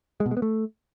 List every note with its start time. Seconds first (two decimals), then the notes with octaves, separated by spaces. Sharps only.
0.20 G#3
0.26 B2
0.31 G#3
0.37 B3
0.42 A3